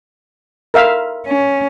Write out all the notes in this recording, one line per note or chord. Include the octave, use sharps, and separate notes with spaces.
A#4 E5 F5
C#4